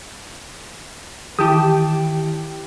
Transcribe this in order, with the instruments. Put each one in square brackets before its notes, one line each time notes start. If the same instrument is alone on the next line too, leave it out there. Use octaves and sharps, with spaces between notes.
[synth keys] D#3 E3 E4 [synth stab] G4 [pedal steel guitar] G5 A5 D#6